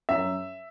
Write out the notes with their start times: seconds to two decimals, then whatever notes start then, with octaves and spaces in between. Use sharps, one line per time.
0.09 F#2 E5